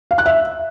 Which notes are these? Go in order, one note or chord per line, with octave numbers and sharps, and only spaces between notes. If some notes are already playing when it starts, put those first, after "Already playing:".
F5
F#6
E5